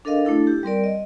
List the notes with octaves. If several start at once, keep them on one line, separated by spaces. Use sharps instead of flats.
D4 A4 A#4 D#5 F5
A3 D4 E4 A4
G4
G3 C4 A#4 D5
D#5